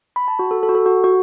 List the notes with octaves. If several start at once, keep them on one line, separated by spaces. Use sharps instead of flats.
B5
A5
F#4
A4
A4
F#4
A4
F#4
F#4